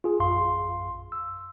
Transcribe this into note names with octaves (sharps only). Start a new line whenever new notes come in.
F4 G#4
A#1 F#2 F5 C6
E6